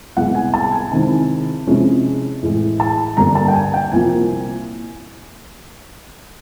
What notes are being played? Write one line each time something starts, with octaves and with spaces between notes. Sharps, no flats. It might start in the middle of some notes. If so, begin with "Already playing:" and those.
C2 B2 G#3 F#5
G#5
A5
G#5
C3 D#3 G#3 C4 E4 A5
C3 F3 G#3 C#4 E4
A2 E3 G#3
A5
G2 D3 G3 A#3 D4 A#5
A5
G5
G#5
G5
C2 A#2 F3 A#3 G#5